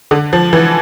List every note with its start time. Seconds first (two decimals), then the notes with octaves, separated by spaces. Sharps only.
0.11 D3
0.33 F3
0.53 E3